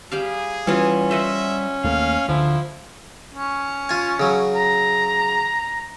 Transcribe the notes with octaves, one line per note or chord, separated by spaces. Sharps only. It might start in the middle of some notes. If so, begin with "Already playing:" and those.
G3 G4 G#4 F5
E3 G3 C#4 F4 F#4
C5 D#5 E5 F#5
D#2 A3 A#3 F5
D2 D3 F3 E4
C#4
F4 G#5
C#3 F#3
A#5